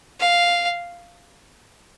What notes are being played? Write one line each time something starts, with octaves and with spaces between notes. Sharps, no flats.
F5